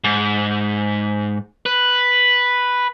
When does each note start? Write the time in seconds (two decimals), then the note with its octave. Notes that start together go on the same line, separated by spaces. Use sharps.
0.04 G#2
1.66 B4